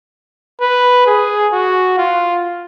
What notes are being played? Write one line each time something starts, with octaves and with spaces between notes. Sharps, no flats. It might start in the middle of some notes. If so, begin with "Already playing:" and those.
B4
G#4
F#4
F4